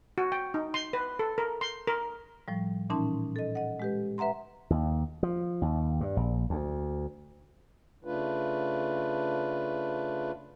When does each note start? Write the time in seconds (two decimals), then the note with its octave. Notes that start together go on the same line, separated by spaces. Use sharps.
0.18 F#4
0.32 G5
0.54 D#4
0.74 C6
0.93 B4
1.19 A4
1.38 A#4
1.61 C6
1.87 A#4
2.48 A2 F3 G3
2.90 A#2 E3 C#4 D#4 A5 C6
3.36 A4 D#5
3.55 D#5 F#5
3.80 G#3 G4 B4
4.18 B4 E5 F#5 A#5 C6
4.70 D#2
5.23 F3
5.62 D#2
6.01 G2
6.17 A#1
6.50 D2
8.05 C#3 A3 D4 F4 B4